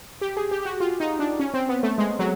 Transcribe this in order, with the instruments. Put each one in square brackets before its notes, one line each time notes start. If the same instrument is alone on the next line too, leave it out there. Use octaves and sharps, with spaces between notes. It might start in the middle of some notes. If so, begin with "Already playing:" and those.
[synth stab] G4
G#4
G4
G4
F#4
F4
D#4
D4
C#4
C4
B3
A3
G#3
F#3